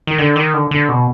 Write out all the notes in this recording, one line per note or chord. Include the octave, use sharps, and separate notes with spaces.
D#3
D3
D#3
D3
D3
B2